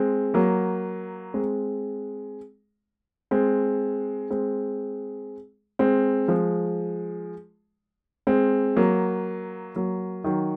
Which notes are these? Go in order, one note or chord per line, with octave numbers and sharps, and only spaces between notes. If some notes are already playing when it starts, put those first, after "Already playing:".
Already playing: G#3 C4
F#3 A#3
G#3 C4
G#3 C4
G#3 C4
G#3 C4
F3 G#3
G#3 C4
F#3 A#3
F#3 A#3
D#3 F#3